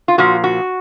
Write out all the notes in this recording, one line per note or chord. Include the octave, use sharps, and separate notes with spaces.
F4
A#2 F3 F#4
F#4